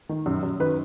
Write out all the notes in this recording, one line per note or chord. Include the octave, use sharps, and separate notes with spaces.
D#3
F#2
F#2
D#3 B4